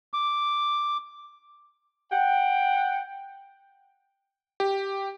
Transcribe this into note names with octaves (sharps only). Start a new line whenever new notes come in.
D6
F#5 G5
G4